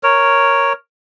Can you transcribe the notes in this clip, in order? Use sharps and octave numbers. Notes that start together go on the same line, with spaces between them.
A#4 C#5